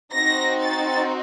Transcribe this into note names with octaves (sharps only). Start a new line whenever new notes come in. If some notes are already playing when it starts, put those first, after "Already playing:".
C4 D#4 F#4 A#6
A6